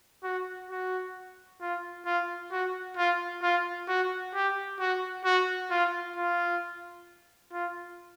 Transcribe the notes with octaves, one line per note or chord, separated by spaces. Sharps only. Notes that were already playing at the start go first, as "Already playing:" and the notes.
F#4
F#4
F4
F4
F#4
F4
F4
F#4
G4
F#4
F#4
F4
F4
F4